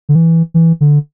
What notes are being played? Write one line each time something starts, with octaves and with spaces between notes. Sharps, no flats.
D3
E3
E3
D3